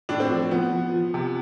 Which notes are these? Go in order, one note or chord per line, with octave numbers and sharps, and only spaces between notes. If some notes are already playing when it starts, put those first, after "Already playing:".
A2 D4
C4
F3
F3 B3
F3
F3
C3